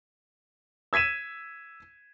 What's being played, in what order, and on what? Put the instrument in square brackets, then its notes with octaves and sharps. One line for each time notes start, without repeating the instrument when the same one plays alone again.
[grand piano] E6 G#6 B6 D#7 E7